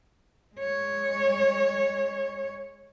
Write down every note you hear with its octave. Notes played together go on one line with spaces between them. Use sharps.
G#3 C#5